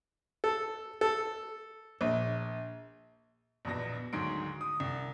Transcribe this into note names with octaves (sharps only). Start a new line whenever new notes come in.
A4
A4
A#1
A#1 E2 B2 A#6
D2 G#2 D#3 F#3 C6 D7
D#6
C2